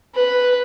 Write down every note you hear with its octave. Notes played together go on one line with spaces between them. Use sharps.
B4